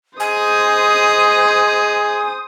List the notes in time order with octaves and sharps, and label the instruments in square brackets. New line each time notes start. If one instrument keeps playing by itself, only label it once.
[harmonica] G#4 D#5 [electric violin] C5 D#6 [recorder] G#5